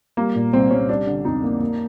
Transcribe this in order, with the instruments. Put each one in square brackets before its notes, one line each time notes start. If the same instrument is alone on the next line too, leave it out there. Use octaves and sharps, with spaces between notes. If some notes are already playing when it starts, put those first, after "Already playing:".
[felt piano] G3 [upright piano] A#3
[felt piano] A#2
[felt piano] C2 [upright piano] C4
[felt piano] C2 [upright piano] C#4
[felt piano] G3 [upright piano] D4
[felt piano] D3
[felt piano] F2 [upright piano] D#4
[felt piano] A#3
A#3